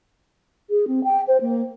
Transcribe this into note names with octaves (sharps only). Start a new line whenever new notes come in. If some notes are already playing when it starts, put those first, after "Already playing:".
G#4
C4
G5
C5
A#3